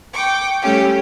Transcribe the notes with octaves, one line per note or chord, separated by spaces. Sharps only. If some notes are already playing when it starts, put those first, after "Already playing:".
G5 C#6 D6
G3 A3 C#4 G4